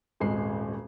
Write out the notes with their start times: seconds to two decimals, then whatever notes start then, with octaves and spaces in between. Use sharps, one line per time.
0.20 D#1 G#1 G#3 C7